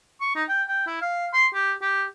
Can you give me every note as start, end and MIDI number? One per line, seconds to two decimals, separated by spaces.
0.21 0.31 85
0.36 0.44 63
0.49 0.63 79
0.68 0.84 79
0.87 0.98 64
1.02 1.27 77
1.33 1.46 84
1.54 1.73 67
1.82 2.04 67